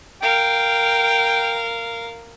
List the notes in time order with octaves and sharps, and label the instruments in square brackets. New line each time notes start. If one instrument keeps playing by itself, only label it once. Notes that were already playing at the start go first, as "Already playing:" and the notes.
[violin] A#4 F5 [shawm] G5